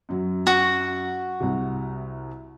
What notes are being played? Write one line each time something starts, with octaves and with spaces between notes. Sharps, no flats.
F#2 F#3
F#4
C2 C3